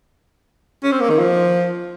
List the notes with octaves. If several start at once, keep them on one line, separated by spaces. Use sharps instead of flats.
C#4
C4
A#3
D#3
F3